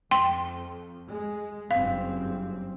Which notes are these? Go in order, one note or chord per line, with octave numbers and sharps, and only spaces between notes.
F2 G5 C6
G#3
F#1 G2 C4 F5